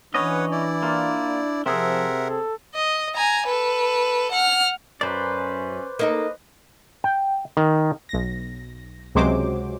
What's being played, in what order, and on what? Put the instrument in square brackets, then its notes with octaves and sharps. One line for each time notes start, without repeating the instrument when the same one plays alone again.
[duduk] E3 [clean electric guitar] C#4 D#5 [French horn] D4 [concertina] B4 C#5 F#5
[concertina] E4 D5
[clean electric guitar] A#3 F4
[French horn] C3 [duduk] F3 [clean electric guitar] C4 G#4 [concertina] A#4 E5 F#5
[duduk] A4
[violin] D#5
G#5 A#5
A4 B4
F#5 F6
[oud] F#2 [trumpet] C#4 [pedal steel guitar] B4 C5 D5
[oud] A#3 D#4 A4 [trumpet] D#5
[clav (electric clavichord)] G5
D#3
[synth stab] B1 A#6
C#2 C3 F#3 G#3 C5 D6